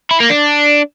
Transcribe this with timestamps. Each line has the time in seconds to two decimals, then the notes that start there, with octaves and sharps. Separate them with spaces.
0.11 E4
0.20 A#3
0.30 D4